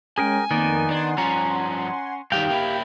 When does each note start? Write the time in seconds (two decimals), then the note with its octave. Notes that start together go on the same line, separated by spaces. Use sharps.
0.18 G#3 C#4 G#4 A#4 G5 G#5
0.51 F2 D#3 A#3 B3 D#4 D5
0.91 D4 F#5 G#5 C6
1.18 G2 F3 C#4 A#5
2.32 G2 D#3 G4 F5 G5
2.50 A#3 E4